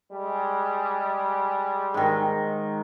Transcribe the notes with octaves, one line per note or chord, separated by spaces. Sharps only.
G3 G#3
G#2 D#3